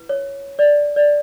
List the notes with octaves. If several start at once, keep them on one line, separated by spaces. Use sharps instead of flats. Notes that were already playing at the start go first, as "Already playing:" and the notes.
Already playing: E4 B4
C#5
D5
D5